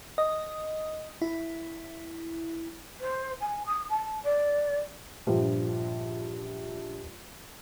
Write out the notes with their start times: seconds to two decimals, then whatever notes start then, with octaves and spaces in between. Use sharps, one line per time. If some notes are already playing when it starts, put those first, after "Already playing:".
0.18 D#5
1.22 E4
3.00 C5
3.40 G#5
3.66 D#6
3.89 A5
4.24 D5
5.27 A#1 G2 F3